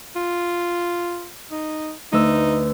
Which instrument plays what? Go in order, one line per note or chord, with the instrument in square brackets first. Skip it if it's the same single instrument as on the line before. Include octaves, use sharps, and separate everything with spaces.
[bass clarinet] F4
D#4
[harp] D2 B4 E6 [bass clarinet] D#4